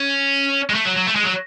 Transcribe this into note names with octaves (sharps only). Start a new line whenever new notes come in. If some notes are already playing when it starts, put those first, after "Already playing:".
Already playing: C#4
G#3
A3
F#3
F#3
A3
G#3
F#3